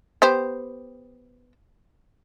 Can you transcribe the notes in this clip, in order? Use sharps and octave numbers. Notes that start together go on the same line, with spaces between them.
B3 G4 C5